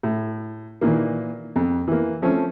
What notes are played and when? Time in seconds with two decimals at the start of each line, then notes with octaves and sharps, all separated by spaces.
0.03 A2
0.81 A#2 D#3 E3 A#3
1.56 F2
1.88 E3 A#3
2.22 F3 A3 C4 C#4